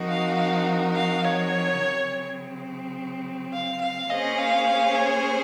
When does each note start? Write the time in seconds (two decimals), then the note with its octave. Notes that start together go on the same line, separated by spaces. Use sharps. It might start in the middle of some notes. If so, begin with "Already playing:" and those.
Already playing: F3 C4 D#4 F#4 A#4
0.09 F5
0.38 F5
0.95 F5
1.24 C#5
1.80 C#3 F#3 C4
3.53 F5
3.81 F5
4.10 A#3 C#4 G#4 C5 D#5
4.38 F5
4.67 F5
4.95 C#5